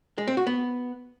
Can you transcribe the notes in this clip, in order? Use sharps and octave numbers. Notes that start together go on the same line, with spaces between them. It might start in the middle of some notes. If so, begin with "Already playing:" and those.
G#3
C4
F#4
B3